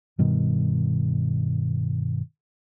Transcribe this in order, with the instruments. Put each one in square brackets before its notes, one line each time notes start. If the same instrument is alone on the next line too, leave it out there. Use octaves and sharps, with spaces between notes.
[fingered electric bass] G2 B2 D#3 G3